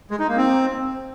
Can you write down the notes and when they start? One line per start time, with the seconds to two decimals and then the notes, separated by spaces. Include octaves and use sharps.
0.11 G#3
0.19 D#4
0.28 A#3
0.37 C4